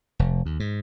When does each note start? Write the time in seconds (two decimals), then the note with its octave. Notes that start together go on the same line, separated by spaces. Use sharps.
0.19 F1
0.46 D#2
0.60 G#2